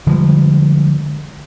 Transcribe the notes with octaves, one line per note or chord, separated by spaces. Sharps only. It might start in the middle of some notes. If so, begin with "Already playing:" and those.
D3 F3 G3 G#3